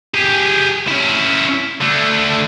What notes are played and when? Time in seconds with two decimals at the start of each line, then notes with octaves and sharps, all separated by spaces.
0.14 G4 G#4
0.88 C#4 E4
1.81 D3 A3